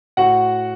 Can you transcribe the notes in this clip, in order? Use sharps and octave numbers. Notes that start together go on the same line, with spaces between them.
A2 F#4 F#5